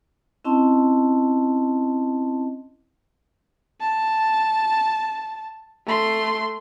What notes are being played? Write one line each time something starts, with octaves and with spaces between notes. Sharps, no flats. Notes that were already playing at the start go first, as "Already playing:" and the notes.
C4 C#4 E4 D#5 A5 C6
A5
A3 C6